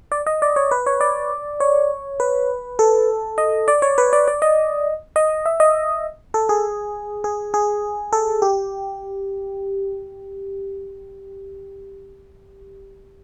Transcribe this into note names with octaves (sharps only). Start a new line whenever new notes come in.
D5
D#5
D5
C#5
B4
C#5
D5
C#5
B4
A4
D#5
D5
C#5
B4
D5
D5
D#5
D#5
E5
D#5
A4
G#4
G#4
G#4
A4
G4